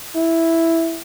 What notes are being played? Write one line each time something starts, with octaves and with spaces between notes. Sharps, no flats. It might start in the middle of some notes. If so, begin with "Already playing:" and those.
E4